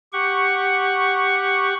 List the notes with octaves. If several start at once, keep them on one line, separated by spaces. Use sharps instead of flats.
G4 F#5 C#6